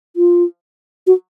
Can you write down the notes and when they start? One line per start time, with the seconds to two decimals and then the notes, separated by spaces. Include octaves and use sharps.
0.16 F4
1.07 F#4